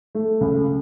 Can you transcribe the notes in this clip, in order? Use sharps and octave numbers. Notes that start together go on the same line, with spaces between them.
A3
C#2